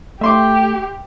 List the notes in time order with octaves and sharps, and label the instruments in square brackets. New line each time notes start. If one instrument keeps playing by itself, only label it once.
[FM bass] A3 [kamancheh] G4 [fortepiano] E5 C6 D6